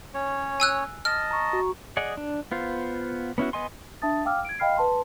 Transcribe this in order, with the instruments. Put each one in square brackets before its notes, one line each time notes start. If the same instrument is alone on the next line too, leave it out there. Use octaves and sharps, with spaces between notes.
[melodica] C#4 C#5
[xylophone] G#5 E6 F#6
[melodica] D#5 A5 [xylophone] F6
[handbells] A#5 C#6
F#4
[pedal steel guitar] G#4 D5 D#5 F#5
D4
B3 F4 C5
B3 C#4 E4 F#4
B3 D#5 G#5 C6
[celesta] D4 E5 A5 D#6 A6
F5 G5 D6 E6 F6
G#6 D7
D#5 F5 G5 B5 F6 C7
B4 A5 C6